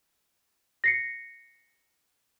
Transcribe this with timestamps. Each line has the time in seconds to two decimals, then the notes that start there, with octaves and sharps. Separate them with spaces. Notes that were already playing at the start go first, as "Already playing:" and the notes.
0.84 A#6 C7 C#7